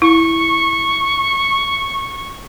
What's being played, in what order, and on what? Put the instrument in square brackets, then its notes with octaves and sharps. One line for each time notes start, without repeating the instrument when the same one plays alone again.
[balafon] E4 [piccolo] C#6